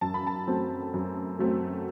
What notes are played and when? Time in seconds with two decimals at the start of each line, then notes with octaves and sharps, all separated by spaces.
0.01 F#2 A5
0.14 B5
0.27 A5
0.47 F#3 A3 C4
0.94 F#2
1.39 F#3 A3 C4